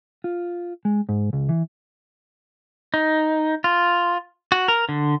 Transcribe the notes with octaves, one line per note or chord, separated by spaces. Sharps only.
F4
G#3
G#2
C#2
E3
D#4
F4
F#4
A#4
D3